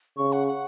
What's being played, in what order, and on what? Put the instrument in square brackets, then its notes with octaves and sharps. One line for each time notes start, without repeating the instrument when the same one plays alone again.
[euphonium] C#3 [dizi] C#6
[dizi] F#5
F#5